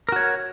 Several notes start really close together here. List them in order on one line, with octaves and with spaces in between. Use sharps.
A#4 F#4 C#5